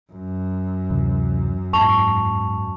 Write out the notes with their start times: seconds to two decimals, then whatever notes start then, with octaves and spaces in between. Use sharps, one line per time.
0.12 F#2
0.90 D2 C3 E3
1.73 E2 G#2 A5 C#6 F7